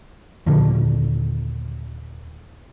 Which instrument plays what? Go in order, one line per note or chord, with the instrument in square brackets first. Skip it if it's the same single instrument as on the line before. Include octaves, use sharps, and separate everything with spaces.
[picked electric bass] D#2 A#2 D3